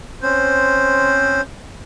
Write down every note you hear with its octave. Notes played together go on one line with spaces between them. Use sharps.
C4 C#4 C5